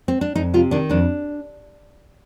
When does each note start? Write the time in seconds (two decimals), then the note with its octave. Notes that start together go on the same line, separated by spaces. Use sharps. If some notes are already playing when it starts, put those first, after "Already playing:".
0.08 C4
0.21 D4
0.36 F2 D#4
0.54 C3 F4
0.71 D#3 D4
0.89 F2 D4